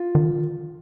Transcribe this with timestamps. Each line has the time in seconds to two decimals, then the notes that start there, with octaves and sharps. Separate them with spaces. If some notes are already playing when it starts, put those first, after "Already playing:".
Already playing: F4
0.15 D#3